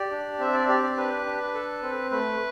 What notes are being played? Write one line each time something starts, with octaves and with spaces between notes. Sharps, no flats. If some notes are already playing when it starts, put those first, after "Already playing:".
Already playing: G4 D5
D4
C4 E5
D5
G4 D5
D5
D4 B4
D4
A4
C4
A3 B4